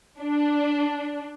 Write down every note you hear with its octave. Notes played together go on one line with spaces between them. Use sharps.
D4